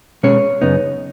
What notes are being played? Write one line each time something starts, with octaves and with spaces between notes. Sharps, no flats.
B2 G#3 C#4 C#5
F#2 C#3 B3 D#4